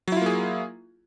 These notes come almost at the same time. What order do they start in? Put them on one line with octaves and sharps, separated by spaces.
F#3 E4 F4 A#3 G#4